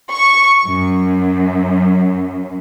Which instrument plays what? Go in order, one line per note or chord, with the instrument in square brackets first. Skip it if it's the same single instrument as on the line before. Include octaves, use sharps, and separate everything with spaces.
[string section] C#6
F#2